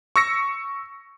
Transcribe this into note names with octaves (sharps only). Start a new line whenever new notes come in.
C#6 E6 A#6 C#7